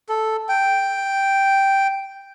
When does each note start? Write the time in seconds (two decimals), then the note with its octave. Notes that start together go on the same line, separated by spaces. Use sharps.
0.09 A4
0.49 G5